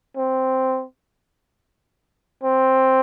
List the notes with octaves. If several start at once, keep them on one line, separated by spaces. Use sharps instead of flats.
C4
C4